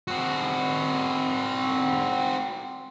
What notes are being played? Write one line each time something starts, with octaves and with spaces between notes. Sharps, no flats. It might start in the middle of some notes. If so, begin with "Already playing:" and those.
C4 F#4